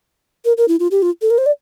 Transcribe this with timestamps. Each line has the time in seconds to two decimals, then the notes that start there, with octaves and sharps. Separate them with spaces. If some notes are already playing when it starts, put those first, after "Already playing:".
0.45 A#4
0.57 A#4
0.68 E4
0.80 F4
0.91 G4
1.02 F4
1.22 A4
1.30 A#4
1.38 C5
1.46 D5